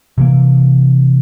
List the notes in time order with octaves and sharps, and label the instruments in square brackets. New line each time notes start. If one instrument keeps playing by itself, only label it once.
[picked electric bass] C3 E3 A#3